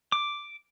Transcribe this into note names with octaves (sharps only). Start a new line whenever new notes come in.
D6